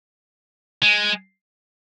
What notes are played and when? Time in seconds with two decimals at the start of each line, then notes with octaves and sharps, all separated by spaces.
0.83 G#3